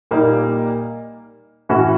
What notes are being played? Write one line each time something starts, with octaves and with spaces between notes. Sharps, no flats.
A#2 G3 A#3 D#4
A2 E3 A3 C#4 F#4